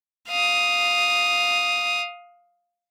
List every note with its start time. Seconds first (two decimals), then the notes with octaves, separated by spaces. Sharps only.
0.29 F5 D#6